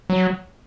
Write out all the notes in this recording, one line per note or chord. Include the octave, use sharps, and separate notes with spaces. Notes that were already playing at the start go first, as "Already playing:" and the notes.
F#3